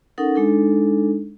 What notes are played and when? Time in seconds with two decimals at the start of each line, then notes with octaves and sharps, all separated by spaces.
0.18 C#4 D#4 A4 A#4 F#5 D#6
0.36 G#3 D4 D#4 A4